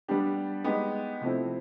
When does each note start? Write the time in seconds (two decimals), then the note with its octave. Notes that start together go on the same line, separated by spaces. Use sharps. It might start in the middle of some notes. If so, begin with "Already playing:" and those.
0.08 G3 B3 D4 G4
0.64 G#3 B3 D#4 G4
1.21 C3 F3 A3 C4 E4